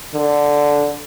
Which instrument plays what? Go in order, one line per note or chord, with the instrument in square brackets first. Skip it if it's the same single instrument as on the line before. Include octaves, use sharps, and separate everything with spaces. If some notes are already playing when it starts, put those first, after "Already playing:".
[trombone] D3